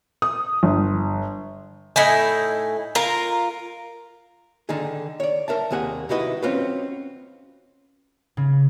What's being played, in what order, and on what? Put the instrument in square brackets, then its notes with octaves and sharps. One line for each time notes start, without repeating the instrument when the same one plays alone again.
[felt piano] D#6
G1
[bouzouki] A2 D#4 E4 G#5
F4 A#4 A#5
[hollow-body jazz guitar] D3 D#3 D#4 G#4
C#5 D5
A#4 E5 A5
D#2 C3 A#3 G#4 F#5
C3 D#4 E4 F#4 B4 D#5
C4 C#4 F4 F#4 B4
[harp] C#3